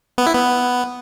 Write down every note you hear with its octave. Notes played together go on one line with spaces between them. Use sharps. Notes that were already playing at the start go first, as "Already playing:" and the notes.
B3
E4
B3